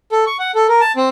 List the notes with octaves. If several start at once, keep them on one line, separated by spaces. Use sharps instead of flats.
A4
C#6
F#5
A4
A#4
A5
C4